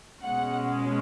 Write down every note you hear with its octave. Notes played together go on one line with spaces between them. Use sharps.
B2 G#3 C#4 F#5